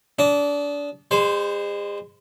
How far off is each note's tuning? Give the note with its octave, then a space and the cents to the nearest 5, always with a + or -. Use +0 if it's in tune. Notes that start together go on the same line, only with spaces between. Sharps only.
D4 -25 D#5 +0
G#3 -40 C5 -10